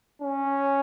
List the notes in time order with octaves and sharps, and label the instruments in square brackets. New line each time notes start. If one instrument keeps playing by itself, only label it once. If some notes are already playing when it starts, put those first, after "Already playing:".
[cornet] C#4